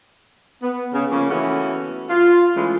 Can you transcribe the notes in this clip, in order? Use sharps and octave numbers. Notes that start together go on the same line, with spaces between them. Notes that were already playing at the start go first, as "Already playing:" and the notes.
B3
C#3
C#3 F3 A#3 C#4
E3 A3 B3 C#4 E4 F#4
F4
E3 G#3 A3 C#4 E4